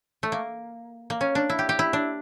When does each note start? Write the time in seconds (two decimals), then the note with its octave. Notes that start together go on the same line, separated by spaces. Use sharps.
0.23 A3
0.32 A#3
1.10 A#3
1.21 C#4
1.35 D4
1.50 E4
1.59 G4
1.69 G4
1.79 E4
1.93 D4